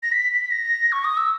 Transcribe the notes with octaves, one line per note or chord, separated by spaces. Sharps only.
A#6
B6
B6
A#6
C#6
D#6
E6